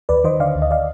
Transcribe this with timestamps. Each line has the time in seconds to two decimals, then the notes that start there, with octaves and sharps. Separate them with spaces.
0.09 D#2 B4 D5
0.24 D#3 C5 D#5
0.40 D3 D5 F5
0.55 D2
0.62 D#5
0.71 D5 F5